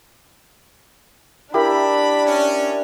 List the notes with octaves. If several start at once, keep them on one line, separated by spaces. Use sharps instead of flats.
D4 E4 G4 A#4 B5
C#4